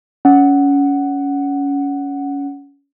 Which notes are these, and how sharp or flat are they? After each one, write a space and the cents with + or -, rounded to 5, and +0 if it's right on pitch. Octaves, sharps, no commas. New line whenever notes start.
C#4 +20 F#5 +0